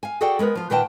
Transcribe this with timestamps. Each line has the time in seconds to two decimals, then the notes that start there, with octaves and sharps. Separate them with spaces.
0.03 F5 G#5
0.21 F#4 G#4 A4 D5 F#5 G5
0.39 G#3 B3 A#4 B4
0.55 F3 F4
0.70 A#2 D#3 B4 F#5 G5 A5